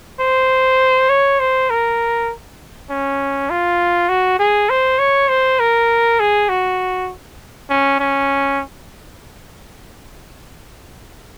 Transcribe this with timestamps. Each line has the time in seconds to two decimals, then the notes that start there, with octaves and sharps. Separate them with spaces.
0.20 C5
1.09 C#5
1.40 C5
1.70 A#4
2.90 C#4
3.50 F4
4.09 F#4
4.39 G#4
4.70 C5
4.99 C#5
5.29 C5
5.60 A#4
6.20 G#4
6.49 F#4
7.70 C#4
8.00 C#4